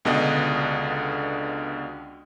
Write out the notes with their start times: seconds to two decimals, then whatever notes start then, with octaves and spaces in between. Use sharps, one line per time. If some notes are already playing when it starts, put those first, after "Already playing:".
0.05 C#2 B2 D3 D4 D#5 D#6